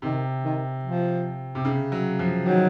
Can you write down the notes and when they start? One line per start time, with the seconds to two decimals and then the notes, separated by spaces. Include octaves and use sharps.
0.02 C3 D#3
0.44 D#3
0.83 F3
1.55 C3
1.65 C#3
1.92 F#3
2.19 F3
2.46 D#3 F#3